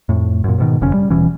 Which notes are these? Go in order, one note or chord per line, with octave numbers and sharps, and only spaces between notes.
F2 A2
F#2 A#2
G#2 B2 D#3
F#1 F2 C#3 C#4
G3
D#1 B2 E3 C#4